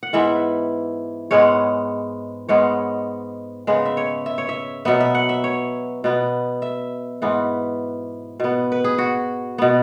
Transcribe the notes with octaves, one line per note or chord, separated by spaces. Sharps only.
F#5
G#2 E3 B3 E5
G#2 G#3 B3 C#5
G#2 G#3 B3 C#5
C#3 G#3 B3 B4
E5
C#5
E5
C#5
E5
B2 F#3 B3 E5
E5
F#5
E5
C#5
B2 B3
E5
G#2 E3 B3
B2 B3
B4
G#4
F#4
B2 B3